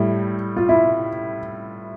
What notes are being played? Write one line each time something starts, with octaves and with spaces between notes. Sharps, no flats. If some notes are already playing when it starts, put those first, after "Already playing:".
Already playing: A2 G3 E4
F4
E4